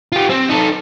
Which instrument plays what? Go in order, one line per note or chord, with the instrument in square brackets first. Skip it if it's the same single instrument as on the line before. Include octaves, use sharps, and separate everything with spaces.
[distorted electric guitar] F4 G4
C4
D#4 A4